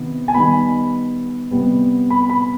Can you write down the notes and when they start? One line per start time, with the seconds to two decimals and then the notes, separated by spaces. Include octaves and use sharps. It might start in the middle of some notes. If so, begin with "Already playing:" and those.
Already playing: C3 D#3 B3
0.28 G#5
0.34 D#3 G3 B3 B5
1.51 C3 G3 B3
2.10 B5
2.30 B5